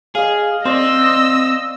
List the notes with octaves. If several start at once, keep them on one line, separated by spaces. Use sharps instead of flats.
G#4 D#5 F5
C4 C5 D5 D#5 E6